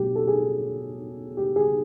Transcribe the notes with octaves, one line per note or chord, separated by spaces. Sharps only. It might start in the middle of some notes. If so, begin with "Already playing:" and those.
Already playing: B2 F#3 A3 G4
A4
G#4
G4
G#4